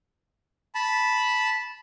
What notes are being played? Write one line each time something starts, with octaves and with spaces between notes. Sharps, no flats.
A5 B5